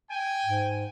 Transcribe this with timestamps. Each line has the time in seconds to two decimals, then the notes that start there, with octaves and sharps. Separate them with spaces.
0.10 G5 G#5
0.45 G#2